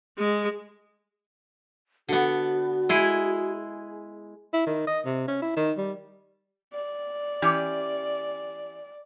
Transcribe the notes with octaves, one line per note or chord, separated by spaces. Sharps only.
G#3
D3 B3 F#4
G#3 E4 G#4
E4
D#3
D#5
C3
C#4
E4
D#3
G3
D5
E3 C#4 G4